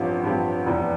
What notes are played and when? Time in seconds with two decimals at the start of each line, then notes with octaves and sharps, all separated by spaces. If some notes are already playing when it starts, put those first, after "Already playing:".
Already playing: A1 G2 F3 C4 G4
0.23 A1 G2 F3 C4 G4
0.66 F1 E2 E3